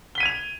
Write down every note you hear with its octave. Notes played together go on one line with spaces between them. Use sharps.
G#6 B6 D#7 F7 G7